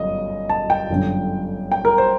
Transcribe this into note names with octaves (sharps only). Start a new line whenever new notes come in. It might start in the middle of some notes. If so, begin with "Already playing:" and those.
Already playing: G1 F#2 D#5
A5
G5
G1 F#2 D3
G5
A#4
C5